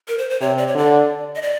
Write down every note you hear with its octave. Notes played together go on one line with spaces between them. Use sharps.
A#4
C5
C5
C3 C#5
D5
C#5
D3 D5
D#5
D5